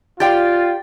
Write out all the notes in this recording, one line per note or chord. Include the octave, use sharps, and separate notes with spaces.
F4 G4 D5 F5 G5 A6